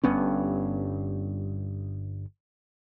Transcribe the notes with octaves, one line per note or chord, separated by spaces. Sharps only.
G1 G2 B3 C#4